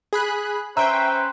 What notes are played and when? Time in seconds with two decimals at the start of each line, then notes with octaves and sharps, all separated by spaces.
0.13 G#4 B5 F#6
0.77 C#4 B4 C5 E5 G5 A#5